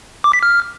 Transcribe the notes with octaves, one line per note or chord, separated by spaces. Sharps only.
D6
B6
F6